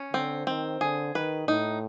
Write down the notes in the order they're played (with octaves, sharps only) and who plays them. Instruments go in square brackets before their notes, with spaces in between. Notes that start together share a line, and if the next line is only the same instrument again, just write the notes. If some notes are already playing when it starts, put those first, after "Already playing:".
Already playing: [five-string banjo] C#4
[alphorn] D3 [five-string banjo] C4
[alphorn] D#3 [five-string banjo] C4
[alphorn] D3 [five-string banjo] G#4
[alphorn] D#3 [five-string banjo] B4
[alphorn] A2 [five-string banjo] D#4